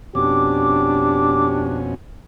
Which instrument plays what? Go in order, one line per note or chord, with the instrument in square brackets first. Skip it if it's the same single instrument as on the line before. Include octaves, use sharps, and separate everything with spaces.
[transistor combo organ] F2 B2 C#4 [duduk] D4 [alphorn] G4 [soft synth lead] D6